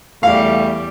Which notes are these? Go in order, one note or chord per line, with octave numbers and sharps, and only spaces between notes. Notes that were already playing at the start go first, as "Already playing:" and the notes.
E2 G3 A3 F5